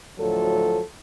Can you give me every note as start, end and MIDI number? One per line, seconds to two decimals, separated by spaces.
0.18 0.80 38
0.18 0.80 45
0.18 0.80 53
0.18 0.80 54
0.18 0.80 69